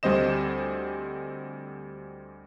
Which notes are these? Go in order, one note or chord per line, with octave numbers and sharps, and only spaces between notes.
D2 G3 C4 C5 D#5 E7